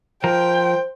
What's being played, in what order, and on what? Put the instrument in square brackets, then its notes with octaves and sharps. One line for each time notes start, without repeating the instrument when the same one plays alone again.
[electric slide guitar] F3 A#4 [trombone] C5 [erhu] G5